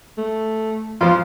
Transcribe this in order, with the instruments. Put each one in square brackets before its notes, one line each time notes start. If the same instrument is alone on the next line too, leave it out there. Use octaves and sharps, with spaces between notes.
[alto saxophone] A3
[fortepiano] F2 F3 [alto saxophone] F4